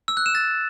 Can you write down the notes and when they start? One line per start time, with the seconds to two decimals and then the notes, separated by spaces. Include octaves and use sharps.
0.08 E6
0.17 F#6
0.26 E7
0.35 A6